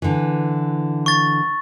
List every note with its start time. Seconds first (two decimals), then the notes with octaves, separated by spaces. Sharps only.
0.02 D3 E3
1.06 C#6 A6